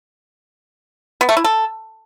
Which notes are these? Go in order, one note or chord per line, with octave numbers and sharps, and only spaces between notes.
B3
A3
E4
A4